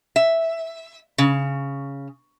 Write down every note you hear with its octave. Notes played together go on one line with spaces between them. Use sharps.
E5
C#3